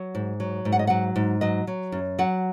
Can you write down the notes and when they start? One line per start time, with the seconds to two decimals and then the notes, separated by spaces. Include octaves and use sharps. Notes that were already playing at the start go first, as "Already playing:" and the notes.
Already playing: F#3
0.15 G#2
0.40 F#3
0.65 G#2
0.72 F#5
0.79 D#5
0.87 F#3 F#5
1.16 G#2
1.41 F#3 D#5
1.67 F#3
1.92 F#2
2.19 F#3 F#5